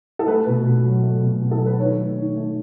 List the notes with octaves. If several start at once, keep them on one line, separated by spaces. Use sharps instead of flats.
A4
A3 B4
B2
B2
F#3
A3
B2
B2
A4
F#3
B4
D#3 C#5
A3
D#3
A3